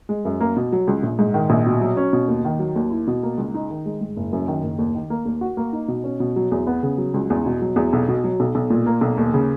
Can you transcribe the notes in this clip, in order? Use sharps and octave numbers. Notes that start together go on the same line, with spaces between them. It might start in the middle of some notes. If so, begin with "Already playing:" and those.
G#3
F#2
A#3
B2
F#3
C#2
A#1
G#2
D#3
A#1
B2
F#3
C#4
B2
D#2
D#3
F#3
D#2
E4
B2
A#3
C#2
D#4
D#3
G#3
G#2
F#1
F#2
D#3
F#1
D#2
D#3
A#3
D#2
F#4
A#3
D#4
B2
C#4
B2
F#3
E2
B3
C#3
F#3
C#2
E2
B2
F#3
E2
B1
B2
F#3
B1
B1
A#2
A#3
B1
D#2
C#3